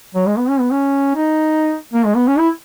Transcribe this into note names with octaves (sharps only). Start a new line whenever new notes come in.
F#3
G#3
B3
C#4
B3
C#4
D#4
A#3
G#3
B3
C#4
E4